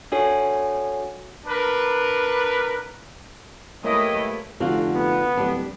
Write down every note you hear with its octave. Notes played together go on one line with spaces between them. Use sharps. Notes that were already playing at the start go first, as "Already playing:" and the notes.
D4 F#4 A4 C#5 G#5
D4 A#4 B4
A3 A#3 E4 G4 A#4 B4 C#5 D#5
F1 D3 F4 F#4
B3
D1 G3 D4